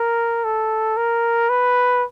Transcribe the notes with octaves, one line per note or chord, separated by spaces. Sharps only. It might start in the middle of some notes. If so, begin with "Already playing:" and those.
Already playing: A#4
A4
A#4
B4